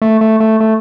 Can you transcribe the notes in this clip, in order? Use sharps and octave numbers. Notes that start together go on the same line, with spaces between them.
A3
A3
A3
A3